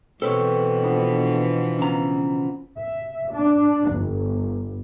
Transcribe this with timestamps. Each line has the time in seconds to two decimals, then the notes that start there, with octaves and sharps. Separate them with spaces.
0.22 B2 E3 C4 A4 B4 C#5
0.83 F3 B3 D4
1.79 C#3 A#5
2.77 E5
3.33 D4
3.90 G1